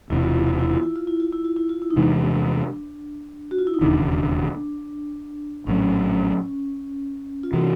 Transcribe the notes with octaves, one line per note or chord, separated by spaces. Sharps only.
E1 E2 C3 E4
F4
E4
F4
E4
F4
E4
F4
E4
F4
E4
F4
E4
F4
E4
D#4
E2 C3 E3 G#3 D4
F#4
F4
E4
D#4
E1 D#2 C#3 D4
A#1 A2 F#3 C#4
F4
C3 E3 F#4